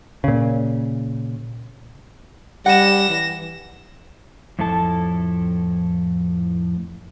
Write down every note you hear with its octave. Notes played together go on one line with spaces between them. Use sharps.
A#2 C#3
G3 F#5 A#6 E7
E3
F2 A2 E4 A4 A5